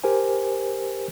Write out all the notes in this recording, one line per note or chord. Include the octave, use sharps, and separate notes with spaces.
G4 A#4 C5 G#5